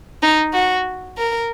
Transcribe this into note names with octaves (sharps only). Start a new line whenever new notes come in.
D#4
F#4
A#4